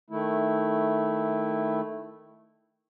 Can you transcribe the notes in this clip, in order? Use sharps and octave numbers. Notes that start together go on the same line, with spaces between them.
D#3 A3 E4